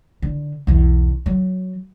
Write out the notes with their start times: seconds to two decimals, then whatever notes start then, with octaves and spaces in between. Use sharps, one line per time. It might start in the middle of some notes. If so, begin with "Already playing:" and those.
0.22 D3
0.67 B1 E2
1.26 F#3